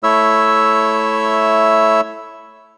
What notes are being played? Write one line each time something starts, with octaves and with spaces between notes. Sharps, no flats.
A3 E4 C#5 E5 E6